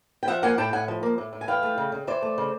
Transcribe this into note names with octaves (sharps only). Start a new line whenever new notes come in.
G5
F3 E5 F#5
A#3 F#5 G#5
A2 G5 A5
A2 F#5 G#5
F3
A#3
A2
A2
G#5
E3 F5 G5
A3
C#3
C#3
E3 C5 D5
A3
C#3